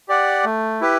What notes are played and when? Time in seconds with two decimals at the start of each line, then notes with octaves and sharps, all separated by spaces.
0.08 G4 D5 F#5
0.44 A3
0.81 E4 G4 B4